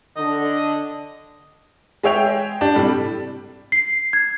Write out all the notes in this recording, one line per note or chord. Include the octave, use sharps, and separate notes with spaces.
D3 D#5
G#3 G#4 C#5 E5 G5 F7
D4 G4
A2 C3 G3
C7
G#6